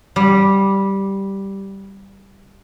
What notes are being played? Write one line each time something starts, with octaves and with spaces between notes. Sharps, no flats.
G3